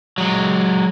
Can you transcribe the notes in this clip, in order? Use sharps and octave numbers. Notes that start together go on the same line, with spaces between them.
F#3 G#3